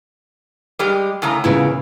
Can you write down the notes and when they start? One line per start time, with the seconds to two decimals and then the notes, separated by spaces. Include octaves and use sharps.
0.79 G3 G#3 G4
1.22 A2 C#3 A#5
1.44 E2 A#2 C#3 E4